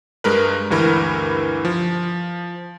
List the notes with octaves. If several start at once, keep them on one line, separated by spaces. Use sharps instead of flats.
G2 G#3 A#4 B4
D2 G2 E3 A#4 B5 F6
F3